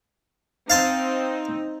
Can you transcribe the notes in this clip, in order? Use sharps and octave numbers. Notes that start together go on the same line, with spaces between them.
C4 D#4 F5 A5 C6